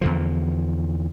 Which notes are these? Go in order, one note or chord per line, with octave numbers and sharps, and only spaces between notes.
E2 D3 F3